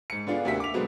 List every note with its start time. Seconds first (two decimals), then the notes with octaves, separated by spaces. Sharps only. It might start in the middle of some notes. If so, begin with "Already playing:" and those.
0.10 G#2 C#7
0.27 D3 B3 D4 F4 G#4
0.45 D2 C3 A#3 F#4 E5 B6
0.60 D6 F7
0.74 B2 D3 F#3 G#3 B3 C4